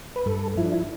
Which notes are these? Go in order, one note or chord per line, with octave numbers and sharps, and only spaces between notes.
B4
G2 A4
F3 E4
D4
E4